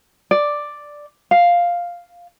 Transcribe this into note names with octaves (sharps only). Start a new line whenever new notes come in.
D5
F5